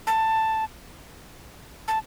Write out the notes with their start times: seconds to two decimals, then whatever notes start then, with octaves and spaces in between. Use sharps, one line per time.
0.07 A5
1.88 A5